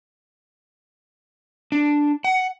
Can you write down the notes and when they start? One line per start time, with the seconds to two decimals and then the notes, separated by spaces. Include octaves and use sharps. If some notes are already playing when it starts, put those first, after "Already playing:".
1.72 D4
2.24 F#5